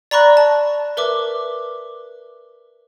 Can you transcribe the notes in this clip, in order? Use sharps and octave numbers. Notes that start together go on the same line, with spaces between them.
D5 A#5 B5 C#6 F#6 A#6
A5
A#4 B4 E5 D6